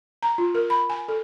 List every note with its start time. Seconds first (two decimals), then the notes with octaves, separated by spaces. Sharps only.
0.23 A#5
0.38 F4
0.55 A#4
0.70 B5
0.90 G#5
1.08 A4